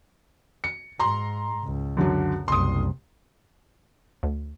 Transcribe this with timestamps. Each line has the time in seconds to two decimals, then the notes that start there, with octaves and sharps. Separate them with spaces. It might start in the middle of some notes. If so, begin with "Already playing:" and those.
0.64 C#7
0.99 G#2 A#5 C6
1.64 C#2
1.97 F#2 D3 F#3
2.48 F#1 C2 C6 D#6
4.23 D2